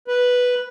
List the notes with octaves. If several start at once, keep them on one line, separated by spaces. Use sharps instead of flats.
B4